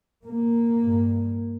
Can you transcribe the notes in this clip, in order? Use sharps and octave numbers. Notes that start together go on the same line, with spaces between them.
A#3
G2